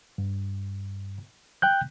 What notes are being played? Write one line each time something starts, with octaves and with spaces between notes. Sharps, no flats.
G2
G5 F#6 G6